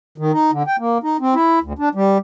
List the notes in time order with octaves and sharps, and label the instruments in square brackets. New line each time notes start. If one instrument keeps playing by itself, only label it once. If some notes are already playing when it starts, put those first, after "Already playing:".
[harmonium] D#3
D#4
D3
G5
A#3
D#4
C4
E4
D2
D4
G3